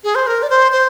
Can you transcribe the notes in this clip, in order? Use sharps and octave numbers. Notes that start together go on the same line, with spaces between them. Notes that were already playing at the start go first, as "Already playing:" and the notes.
G#4
C5
A#4
D5
C5
C5